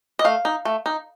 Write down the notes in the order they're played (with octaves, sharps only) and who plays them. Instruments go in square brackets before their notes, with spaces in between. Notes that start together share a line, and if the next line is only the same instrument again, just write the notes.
[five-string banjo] D#5
A3 F5
D#4
A3
D#4